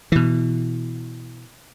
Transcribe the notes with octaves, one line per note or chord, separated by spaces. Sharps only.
B2 E3